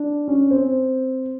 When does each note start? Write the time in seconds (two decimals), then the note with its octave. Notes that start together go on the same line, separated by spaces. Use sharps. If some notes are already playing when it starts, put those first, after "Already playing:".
Already playing: D4
0.28 C#4
0.51 C4